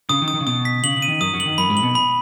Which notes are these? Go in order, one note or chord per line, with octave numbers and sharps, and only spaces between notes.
C#3 D#6
D#3
D#6
D#3
C#3
B2 D#6
B6
C#3 F#7
C#3
D#7
D#3
F#2 F#3 D#6
F#2 F#3
F#7
D#3
F#2 F#3 B5
G#2 G#3
F#7
B2 B3
B5